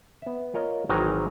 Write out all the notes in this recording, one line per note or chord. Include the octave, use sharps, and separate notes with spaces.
B3 E5
F4 A#4 C#5 D#5
G#1 D#3 E3 F#3 G#5 A#5